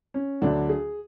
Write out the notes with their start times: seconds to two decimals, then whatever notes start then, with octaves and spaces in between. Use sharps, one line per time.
0.14 C#4
0.41 D2 D3 F#3 D4
0.69 G#4